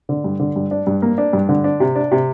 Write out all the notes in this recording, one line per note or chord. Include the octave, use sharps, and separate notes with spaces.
D3
G2
D3
G2
D4
G2
A#3
D4
G2
D3
D4
C3
D4
C3